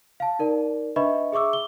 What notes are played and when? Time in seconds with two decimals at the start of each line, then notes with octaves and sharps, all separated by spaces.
0.20 F5 A5
0.39 D#4 A#4 D5
0.96 D4 B4 D#5 E5 B5 C#6
1.32 G#4 E5 C#6 D6 E6
1.53 G7